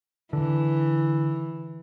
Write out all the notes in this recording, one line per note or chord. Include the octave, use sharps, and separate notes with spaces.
D3 E3